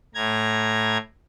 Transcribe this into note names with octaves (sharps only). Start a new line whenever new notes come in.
A2 A#5 G#6